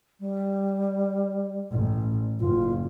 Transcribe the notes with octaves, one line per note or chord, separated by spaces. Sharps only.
G3
A1
F#1 F4